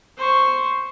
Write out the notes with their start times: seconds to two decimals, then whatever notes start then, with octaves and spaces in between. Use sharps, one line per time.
0.17 C5 C#6